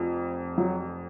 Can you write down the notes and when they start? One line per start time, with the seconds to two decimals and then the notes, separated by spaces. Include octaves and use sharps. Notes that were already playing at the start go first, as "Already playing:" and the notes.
Already playing: F1 F2 F3
0.58 F#3